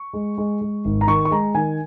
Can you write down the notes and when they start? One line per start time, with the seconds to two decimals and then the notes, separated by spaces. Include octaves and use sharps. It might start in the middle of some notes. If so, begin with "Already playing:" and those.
Already playing: C#6
0.13 G#3
0.38 G#3
0.61 G#3
0.85 G#1
1.01 A#5
1.07 D#3 C#6
1.25 C#6
1.31 G#3 A#5
1.55 D#3 G#5